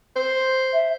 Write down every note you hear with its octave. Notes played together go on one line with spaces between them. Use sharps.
C5
E5